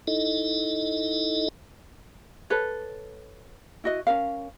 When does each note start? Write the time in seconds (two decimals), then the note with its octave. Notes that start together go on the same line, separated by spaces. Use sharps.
0.08 D#4 E4 A4 D#5
2.50 A4 B4 C#5
3.84 E4 F#4 D#5
4.07 C#4 D#4 A#4 F5